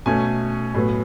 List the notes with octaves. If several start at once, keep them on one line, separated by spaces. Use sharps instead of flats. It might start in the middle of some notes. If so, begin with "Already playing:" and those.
B2 A3 C#4 G#5
A2 F#3 B3